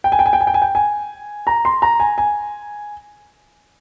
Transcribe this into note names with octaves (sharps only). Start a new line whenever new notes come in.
G5
G#5
G5
G#5
G5
G#5
G5
G#5
G5
G#5
A#5
C6
A#5
G#5
G#5